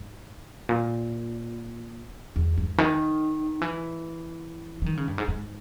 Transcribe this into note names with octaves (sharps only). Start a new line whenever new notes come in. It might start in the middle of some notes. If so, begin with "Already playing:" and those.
Already playing: G#2
A#2
E2
G2
D#3
E3
E3
D#3
C#3
G2
G#2
G#2